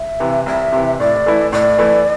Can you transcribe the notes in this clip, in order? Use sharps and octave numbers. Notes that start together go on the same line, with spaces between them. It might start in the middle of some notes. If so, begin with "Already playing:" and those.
Already playing: E5
C3 E3
C2 E5
C3 E3
A2 D5
E3 A3 E4
A2 D5
E3 A3 E4